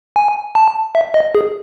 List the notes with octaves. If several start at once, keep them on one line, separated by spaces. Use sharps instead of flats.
G#5
A5
E5
D#5
G#4